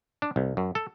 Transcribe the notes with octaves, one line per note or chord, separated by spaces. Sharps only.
D4
C2
F#2
A4